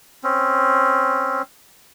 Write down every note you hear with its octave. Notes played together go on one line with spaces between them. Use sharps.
C4 C#4